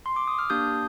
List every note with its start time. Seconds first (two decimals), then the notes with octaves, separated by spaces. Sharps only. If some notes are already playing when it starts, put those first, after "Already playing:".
0.06 C6
0.16 D6
0.28 D#6
0.39 F6
0.50 A#3 D4 G4 D#6 G6